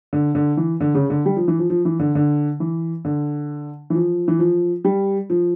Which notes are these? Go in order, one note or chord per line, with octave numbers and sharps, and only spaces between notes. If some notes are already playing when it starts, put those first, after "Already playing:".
D3
D3
E3
D3
C#3
D3
G3
F3
E3
F3
F3
E3
D3
D3
E3
D3
E3
F3
E3
F3
G3
F3